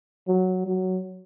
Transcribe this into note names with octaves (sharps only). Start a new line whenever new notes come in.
F#3
F#3